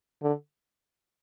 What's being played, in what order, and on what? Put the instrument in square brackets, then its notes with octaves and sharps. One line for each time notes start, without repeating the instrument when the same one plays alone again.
[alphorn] D3